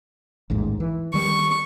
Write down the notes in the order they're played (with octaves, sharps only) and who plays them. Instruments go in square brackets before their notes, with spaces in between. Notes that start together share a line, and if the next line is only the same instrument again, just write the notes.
[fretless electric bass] A1 D#2 G#2
E3
[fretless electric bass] D#3 G3 [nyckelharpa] C#6